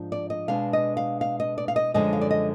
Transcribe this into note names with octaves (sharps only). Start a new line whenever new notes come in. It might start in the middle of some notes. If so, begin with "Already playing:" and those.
Already playing: G#2 F3 D4
D5
D#5
B2 G#3 D4 F5
D#5
F5
F5
D#5
D5
F5
D#5
F#2 D3 F3 G#3 D#5
F5
D5
D#5